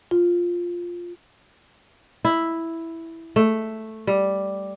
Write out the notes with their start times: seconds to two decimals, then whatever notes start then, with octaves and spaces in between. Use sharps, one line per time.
0.11 F4
2.25 E4
3.36 A3
4.07 G3